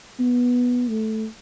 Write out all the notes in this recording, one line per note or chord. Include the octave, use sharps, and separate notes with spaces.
B3
A3